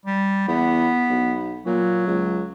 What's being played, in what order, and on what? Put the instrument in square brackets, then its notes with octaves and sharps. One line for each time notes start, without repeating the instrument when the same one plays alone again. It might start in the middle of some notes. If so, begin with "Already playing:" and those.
[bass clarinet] G3
[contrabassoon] E2 [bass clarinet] B3
[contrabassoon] B1
[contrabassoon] A#2 [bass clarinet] F#3
[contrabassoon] C#2